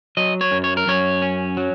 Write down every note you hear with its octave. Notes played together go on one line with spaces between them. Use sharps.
F#3 D#5
C#5
F#2
C#5
A#4
F#2 C#5
C#4
F#3